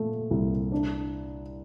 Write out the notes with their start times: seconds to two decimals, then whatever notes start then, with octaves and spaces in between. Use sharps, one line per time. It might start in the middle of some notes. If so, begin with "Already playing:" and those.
Already playing: A#2 A3
0.31 C2
0.72 D4